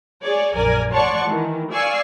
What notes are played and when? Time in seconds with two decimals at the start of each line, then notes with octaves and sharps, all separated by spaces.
0.23 G#4 C#5 D5
0.54 A#1 F#2 A#4 D5 G#5
0.92 C#5 D5 F#5 A5 C6 C#6
1.25 D#3 E3
1.72 D5 F5 G#5 C#6 E6 C7